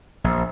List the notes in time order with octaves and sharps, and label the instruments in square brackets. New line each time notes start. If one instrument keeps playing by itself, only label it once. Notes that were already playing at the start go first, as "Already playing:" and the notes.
[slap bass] A#1